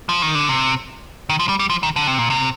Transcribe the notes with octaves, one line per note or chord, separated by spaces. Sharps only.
F3
D#3
D3
C3
D#3
F3
G3
G3
F3
D#3
D3
C3
A#2
C3